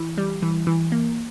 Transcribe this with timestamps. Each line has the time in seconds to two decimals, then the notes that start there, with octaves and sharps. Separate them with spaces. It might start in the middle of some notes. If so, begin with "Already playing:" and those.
Already playing: E3
0.18 G3
0.42 E3
0.67 E3
0.92 A#3